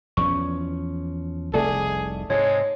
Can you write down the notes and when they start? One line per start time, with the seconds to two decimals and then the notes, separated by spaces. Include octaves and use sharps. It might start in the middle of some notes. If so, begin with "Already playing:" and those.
0.17 E2 F3 C#4 C#6
1.53 F1 C2 A3 G#4 A4 D5
2.30 G#2 C3 G#3 C#5